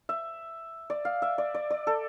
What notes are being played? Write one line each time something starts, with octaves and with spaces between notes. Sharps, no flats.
E5
D5
F5
E5
D5
D5
D5
A4